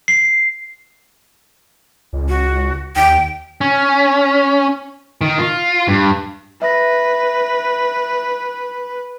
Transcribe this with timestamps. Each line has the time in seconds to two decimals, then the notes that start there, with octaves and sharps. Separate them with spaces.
0.08 C7
2.13 C#2
2.29 F#4
2.96 D#2 G5
3.61 C#4
5.21 D#3
5.39 F4
5.88 G2
6.62 B4 E5 A#6